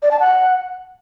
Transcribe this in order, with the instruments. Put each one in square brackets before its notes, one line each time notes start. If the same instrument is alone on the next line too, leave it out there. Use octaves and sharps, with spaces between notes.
[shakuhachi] D5
A5
F#5